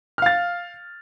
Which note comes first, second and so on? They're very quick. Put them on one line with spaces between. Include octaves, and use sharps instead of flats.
F6 F5 A6